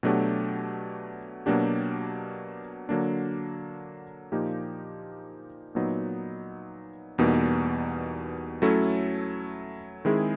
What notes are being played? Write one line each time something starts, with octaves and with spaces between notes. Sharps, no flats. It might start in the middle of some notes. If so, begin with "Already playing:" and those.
B2 F#3 A3 D4 G4
B2 F#3 A#3 D4 G4
D3 F#3 A#3 D4
A#2 F3 A#3 D#4 G4
A#2 F#3 B3 D#4
E2 B2 G3 A#3 D#4
F#3 A3 C#4 E4 A4
D#3 G#3 C4 E4 G#4